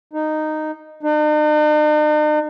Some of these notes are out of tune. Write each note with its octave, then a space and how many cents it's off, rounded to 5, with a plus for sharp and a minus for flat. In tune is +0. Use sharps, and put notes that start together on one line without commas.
D#4 -10
D#4 -45